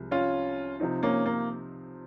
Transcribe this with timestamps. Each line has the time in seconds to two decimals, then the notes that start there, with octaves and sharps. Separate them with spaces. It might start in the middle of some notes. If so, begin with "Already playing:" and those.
Already playing: C2 C3 F3 G#3
0.11 C#4 F4
0.80 C3 F3 C4 D#4
1.03 A#3 C#4
1.26 A#3